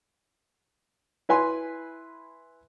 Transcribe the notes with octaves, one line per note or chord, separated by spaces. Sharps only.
E4 B4 G#5 C6